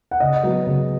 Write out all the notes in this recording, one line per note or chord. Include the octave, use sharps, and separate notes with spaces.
F#5
C#3 D#5
F#3 B3
C#3